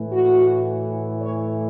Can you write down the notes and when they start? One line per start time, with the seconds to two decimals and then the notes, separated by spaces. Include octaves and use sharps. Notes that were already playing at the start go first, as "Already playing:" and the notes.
Already playing: A2 E3
0.11 F#4
1.21 C#5